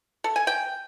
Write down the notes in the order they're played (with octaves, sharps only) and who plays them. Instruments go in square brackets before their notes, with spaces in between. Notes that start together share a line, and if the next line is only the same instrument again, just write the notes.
[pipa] A4
G#5
G5